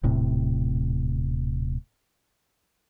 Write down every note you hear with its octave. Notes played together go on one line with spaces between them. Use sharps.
D#1 A2 C3